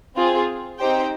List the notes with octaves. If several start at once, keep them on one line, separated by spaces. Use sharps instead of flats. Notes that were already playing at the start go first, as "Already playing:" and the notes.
C4 F4 G#4
C4 D#4 G4 C5 G5